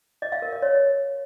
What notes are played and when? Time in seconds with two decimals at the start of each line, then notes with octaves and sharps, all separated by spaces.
0.22 D#5
0.32 F5
0.42 A#4
0.52 D#5
0.62 C#5